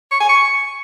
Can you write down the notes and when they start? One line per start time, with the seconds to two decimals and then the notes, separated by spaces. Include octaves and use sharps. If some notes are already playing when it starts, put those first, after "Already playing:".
0.11 C#6
0.20 G#5
0.29 C#6